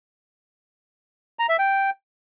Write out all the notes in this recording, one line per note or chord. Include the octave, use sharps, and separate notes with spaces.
A#5
E5
G5